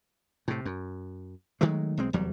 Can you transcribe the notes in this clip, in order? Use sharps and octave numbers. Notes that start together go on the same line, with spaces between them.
A2 C3
F#2
D#3 F#3 G#3 A3
B1 G#3 C4
F1 E2 F#3 G3